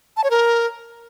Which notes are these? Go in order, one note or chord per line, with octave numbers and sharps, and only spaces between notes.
A5
C#5
A#4